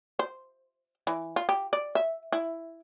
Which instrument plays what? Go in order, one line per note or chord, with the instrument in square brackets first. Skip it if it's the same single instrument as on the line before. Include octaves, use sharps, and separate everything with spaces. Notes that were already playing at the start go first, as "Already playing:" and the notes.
[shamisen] C5
E3
F4
G4
D5
E5
E4